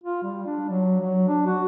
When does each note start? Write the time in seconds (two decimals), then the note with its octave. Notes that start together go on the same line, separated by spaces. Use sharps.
0.04 F4
0.23 G3
0.46 D4
0.69 F#3
1.00 F#3
1.28 D4
1.46 F#4